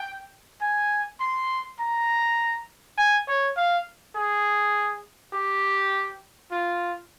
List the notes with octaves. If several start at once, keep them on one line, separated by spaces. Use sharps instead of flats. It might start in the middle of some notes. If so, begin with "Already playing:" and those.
Already playing: G5
G#5
C6
A#5
G#5
C#5
F5
G#4
G4
F4